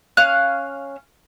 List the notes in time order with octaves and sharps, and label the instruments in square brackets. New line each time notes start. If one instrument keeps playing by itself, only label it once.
[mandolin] C#4 F5 F#6